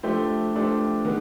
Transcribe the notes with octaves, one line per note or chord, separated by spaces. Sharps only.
F3 A3 D4 G4 C5
F3 A3 D4 G4 C5
D#3 G#3 B3